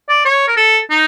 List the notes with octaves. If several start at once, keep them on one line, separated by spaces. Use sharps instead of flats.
D5
C#5
A#4
A4
D#4